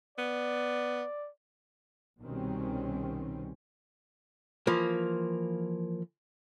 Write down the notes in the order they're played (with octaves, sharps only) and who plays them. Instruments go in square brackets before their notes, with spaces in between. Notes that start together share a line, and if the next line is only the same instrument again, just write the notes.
[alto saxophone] B3 [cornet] D5
[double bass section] C2 B2 D#3 G3 C4 C#4
[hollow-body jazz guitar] E3 F3 A#3